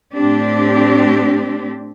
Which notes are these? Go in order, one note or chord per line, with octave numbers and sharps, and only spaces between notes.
A2 C4 D4 G4